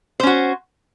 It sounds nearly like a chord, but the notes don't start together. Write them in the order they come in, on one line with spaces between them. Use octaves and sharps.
C5 C#4 F#4